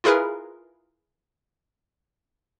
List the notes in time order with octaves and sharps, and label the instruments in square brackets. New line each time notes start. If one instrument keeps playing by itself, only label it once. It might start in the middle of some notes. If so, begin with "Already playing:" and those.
[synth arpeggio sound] E4 F4 G#4 A#4 B4